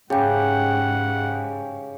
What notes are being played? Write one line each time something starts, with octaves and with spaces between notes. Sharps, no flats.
G#2 C#3 G4 G#4 F#5 G5